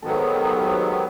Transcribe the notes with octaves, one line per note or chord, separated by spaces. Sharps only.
G#2 D#3 F#3 B3 A4
G4
F4
F#4